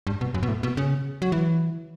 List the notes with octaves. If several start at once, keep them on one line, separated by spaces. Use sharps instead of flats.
G2
B2
F#2
B2
A2
B2
C#3
F#3
E3